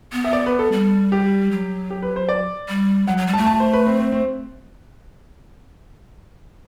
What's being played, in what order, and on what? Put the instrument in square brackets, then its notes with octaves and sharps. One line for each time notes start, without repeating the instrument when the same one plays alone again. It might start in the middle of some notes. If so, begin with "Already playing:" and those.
[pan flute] B3
[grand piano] E5
D5
B4
A4
[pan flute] G3
[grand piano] G4
[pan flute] F#3
[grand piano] G4
B4
C5
D5
[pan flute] G3
[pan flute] F#3 [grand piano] F#5
[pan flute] F#3
G3
[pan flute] A3 [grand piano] A5
[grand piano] A5
C5
B4
C4
C4
C4